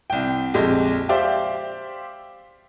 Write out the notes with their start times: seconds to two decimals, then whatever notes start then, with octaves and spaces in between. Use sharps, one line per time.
0.10 C2 G5
0.54 A#1 F2 G#3 G4
1.09 G4 C5 D5 E5 F5 G5